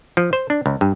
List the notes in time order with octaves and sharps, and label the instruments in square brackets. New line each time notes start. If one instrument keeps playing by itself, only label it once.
[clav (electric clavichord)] F3
C5
D4
C#2
G2